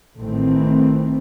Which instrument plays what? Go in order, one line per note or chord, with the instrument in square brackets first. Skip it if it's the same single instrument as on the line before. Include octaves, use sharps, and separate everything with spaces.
[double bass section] A1 A2 D#3 E3 A3 C4